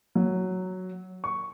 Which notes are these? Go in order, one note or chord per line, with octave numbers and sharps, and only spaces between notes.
F#3
C#6